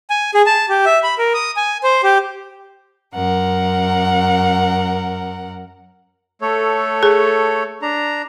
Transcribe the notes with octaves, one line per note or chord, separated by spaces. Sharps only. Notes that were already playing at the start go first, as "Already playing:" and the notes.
G#5
G#4
A5
G4
E5
B5
A#4
D#6
G#5
C5
G4
F#2 A#4 F#5
A3 A4 C#5
G#4
D4 A#5